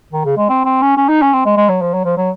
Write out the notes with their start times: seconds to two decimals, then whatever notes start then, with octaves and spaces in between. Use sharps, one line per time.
0.13 D#3
0.25 C#3
0.37 G#3
0.49 C4
0.65 C4
0.82 C#4
0.97 C#4
1.09 D#4
1.22 C#4
1.33 C4
1.45 G#3
1.57 G#3
1.69 F#3
1.82 F3
1.94 F#3
2.05 F3
2.17 F#3